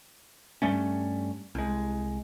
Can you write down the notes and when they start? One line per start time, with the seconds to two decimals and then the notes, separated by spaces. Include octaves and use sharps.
0.62 G2 G3 A3 C#4
1.55 C2 G#3